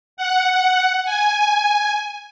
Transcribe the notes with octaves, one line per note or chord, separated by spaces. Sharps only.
F#5
G#5